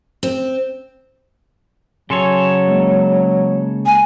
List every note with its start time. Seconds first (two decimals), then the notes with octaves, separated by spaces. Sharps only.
0.23 C4
2.10 C#3 F#3 A4 C#5 G#5 C6
2.68 G#3 A#3
3.86 G#5